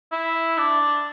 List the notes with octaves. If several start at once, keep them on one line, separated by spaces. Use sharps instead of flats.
E4
D4